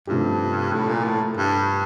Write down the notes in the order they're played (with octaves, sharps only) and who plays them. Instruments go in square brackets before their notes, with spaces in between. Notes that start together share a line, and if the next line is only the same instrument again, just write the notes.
[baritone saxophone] G2 [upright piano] C3 F3 A3 D4 G4
[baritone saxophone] A2
A#2
A2
G2